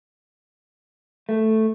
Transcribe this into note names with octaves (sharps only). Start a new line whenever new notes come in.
A3